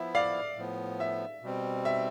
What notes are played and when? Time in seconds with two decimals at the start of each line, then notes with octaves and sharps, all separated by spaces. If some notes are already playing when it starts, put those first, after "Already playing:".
Already playing: F3 B3 E4 E5
0.15 D5 F5
0.57 A2 F3 B3
1.00 E5
1.43 B2 G3 C4
1.85 E5